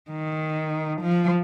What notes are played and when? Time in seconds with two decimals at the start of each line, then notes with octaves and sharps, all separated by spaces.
0.11 D#3
1.01 F3